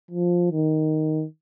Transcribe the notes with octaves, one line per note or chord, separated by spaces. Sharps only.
F3
D#3